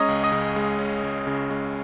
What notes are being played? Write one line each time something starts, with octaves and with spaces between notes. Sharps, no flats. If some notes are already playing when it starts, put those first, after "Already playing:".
Already playing: G#3 C#4 C#5 D#5 A#5 D#6
C#2
D#5 D#6
C#3
G#3
C#4
C#2
C#3
G#3